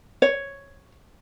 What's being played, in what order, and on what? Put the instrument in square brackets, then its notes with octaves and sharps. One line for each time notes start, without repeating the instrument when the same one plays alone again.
[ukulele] C#5